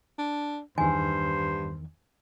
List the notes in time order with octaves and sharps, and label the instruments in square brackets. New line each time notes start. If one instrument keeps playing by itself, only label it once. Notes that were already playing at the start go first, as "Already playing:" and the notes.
[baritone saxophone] D4
[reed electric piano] E2 D#3 [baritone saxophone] G2 [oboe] C5 [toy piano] G#5